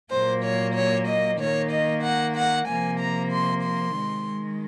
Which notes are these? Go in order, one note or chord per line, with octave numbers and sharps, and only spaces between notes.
A#2 F#3 A#3 C5
C#5
C#5
D#5
D#3 A#3 C#5
D#5
F#5
F#5
C3 F3 A#3 G#5
A#5
C6
C6
D#3 G#3